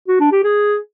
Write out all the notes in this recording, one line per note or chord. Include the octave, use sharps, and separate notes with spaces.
F#4
D4
G4
G#4